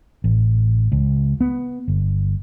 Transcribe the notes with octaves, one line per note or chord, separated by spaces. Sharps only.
A1
C#2
B3
G1